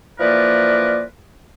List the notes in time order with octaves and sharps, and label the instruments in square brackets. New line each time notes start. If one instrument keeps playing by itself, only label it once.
[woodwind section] E3 F3 A#3 A#4 B4 D5